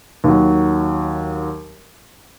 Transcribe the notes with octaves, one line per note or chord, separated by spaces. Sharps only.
D#2 D#3 F#3